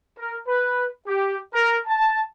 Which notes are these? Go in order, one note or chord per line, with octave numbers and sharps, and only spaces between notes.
A#4
B4
G4
A#4
A5